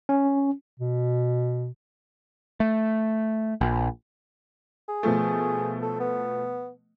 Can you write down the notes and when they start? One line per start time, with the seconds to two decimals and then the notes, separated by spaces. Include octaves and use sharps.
0.09 C#4
0.80 B2
2.60 A3
3.61 A#1
4.89 G#4
5.03 B2 F3 A3
5.82 A4
6.00 B3